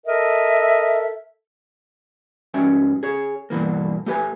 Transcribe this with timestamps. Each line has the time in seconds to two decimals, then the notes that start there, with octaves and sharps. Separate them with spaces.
0.06 A4 A#4 D#5 E5
2.54 G#2 C#4 F#4 E5 G5
3.03 G#4 C#5
3.50 G2 B2 E3 A#3
4.06 A3 G4 B4 G#5